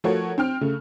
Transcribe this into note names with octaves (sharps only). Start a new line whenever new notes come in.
F3 A3 F#4 A#4 C#5
C4 G5 F6
C#3 A3